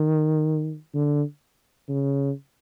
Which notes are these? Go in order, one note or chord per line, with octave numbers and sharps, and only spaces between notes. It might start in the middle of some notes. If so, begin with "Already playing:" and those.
Already playing: D#3
D3
C#3